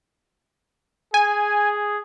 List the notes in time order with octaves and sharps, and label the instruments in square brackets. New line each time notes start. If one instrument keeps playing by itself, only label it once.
[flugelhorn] G#4 [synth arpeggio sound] G#5